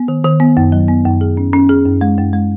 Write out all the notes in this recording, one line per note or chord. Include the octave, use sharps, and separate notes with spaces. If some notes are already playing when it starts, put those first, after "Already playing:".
Already playing: B3
D#3
D#3
B3
F#2
F#3
B3
F#2
G#4
C#4
C#4
G#4
F#2
G#3
F#2
G#3